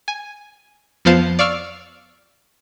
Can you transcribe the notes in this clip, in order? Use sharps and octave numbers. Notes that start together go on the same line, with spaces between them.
G#5
F2 F3 B3 C5 F5 A5
D5 F5 C#6 E6 F6